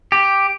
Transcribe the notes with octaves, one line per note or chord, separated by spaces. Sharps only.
G4